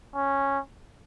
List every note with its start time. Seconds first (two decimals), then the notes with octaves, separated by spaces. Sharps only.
0.15 C#4